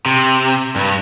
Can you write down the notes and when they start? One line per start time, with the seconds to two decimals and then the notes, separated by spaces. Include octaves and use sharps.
0.06 C3
0.76 G2